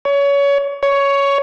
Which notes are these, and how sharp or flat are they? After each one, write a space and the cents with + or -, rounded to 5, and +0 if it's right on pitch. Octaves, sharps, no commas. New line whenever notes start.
C#5 +25
C#5 +10